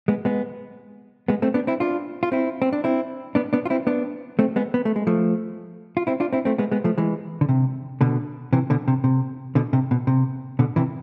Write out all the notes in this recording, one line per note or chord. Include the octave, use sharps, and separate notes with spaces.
G#3 B3
G#3 B3
G#3 B3
A3 C4
B3 D4
C4 E4
D4 F4
F4
C4 E4
C4
D4
C4 E4
B3 D4
B3 D4
F4
C4 E4
B3 D4
A3 C4
G#3 B3
B3
A3
G#3
F3 A3
F4
C4 E4
D4 F4
C4 E4
A3 C4
G#3 B3
G#3 B3
F3 A3
E3 G#3
D3
C3
B2 D3
C3 E3
B2 D3
C3
C3
B2 D3
C3
B2
C3
B2 D3
C3 E3